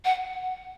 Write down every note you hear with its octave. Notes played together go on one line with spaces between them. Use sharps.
F#5